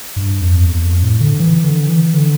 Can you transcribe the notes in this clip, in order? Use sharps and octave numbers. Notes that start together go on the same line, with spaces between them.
G2
F2
E2
F2
A2
D3
E3
D3
E3
D3